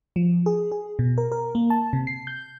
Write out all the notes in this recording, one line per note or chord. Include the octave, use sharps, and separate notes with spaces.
F3
G#4
G#4
B2
A#4
A#4
A#3
A5
C3
C7
G6